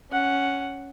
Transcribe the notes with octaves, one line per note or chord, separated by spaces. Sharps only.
C#4 F#5